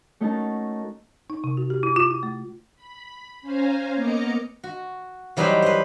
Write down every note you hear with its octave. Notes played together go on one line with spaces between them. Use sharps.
A3 C#4 D#4 F#4 A#4 A5
D#4
C3
F#4
G4
E4
F4
E4
A3
B5
C#4 C5 F5 G#5 A#5
A#3 B3 D#5 A#5 D6 C#7
F#4
E3 F#3 G3 D#4 B4 C5
B4 C5